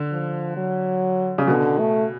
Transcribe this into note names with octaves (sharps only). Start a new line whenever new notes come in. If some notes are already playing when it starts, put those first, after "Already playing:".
Already playing: D3
F3
F#3
C#3
B2 D3
A3